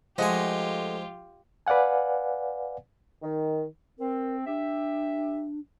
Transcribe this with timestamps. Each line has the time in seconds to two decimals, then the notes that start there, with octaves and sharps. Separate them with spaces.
0.18 F3 G#3 A3 F4 G4 D#5 F#5 G#5
1.67 B4 D5 F5 F#5 G#5
3.22 D#3
3.99 C4 A#4
4.46 D4 G4 E5